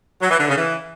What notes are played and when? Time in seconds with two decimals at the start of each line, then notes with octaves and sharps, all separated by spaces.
0.22 F#3
0.31 E3
0.40 D3
0.49 C#3
0.58 E3